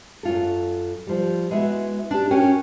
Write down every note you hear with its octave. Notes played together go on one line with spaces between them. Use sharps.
F#2 F4 A4
F3 G3
G#3 B3 E4 F#4 E5
D4 G4
C#4 F#4 A#4 G5